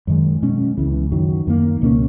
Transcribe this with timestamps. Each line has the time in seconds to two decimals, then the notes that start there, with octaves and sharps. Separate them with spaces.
0.07 F#2 D#3 G#3
0.43 B2 G#3 C#4
0.77 C#2 C#3 E3
1.12 F#2 D#3 F#3
1.47 F#2 D#3 A#3
1.82 C#2 B2 A#3 C#4